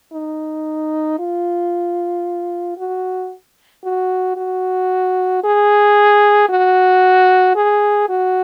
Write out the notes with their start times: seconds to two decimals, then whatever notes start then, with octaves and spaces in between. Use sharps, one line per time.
0.13 D#4
1.19 F4
2.78 F#4
3.84 F#4
4.37 F#4
5.44 G#4
6.49 F#4
7.56 G#4
8.09 F#4